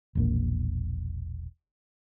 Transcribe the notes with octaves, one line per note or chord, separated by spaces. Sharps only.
E1 A#1 A#3